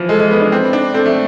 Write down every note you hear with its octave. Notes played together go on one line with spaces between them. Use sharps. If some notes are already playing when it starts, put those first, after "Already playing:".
Already playing: E3 F3
G#3 A4
G#3
B3
D4
C4
D4
C4 A4
A3